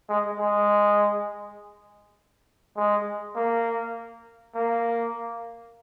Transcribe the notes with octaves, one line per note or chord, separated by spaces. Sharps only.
G#3
G#3
G#3
A#3
A#3